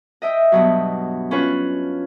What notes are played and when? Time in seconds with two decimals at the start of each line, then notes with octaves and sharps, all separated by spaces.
0.22 D#5 E5 G5
0.52 G2 B2 F#3
1.31 C#4 F4 B4 C#5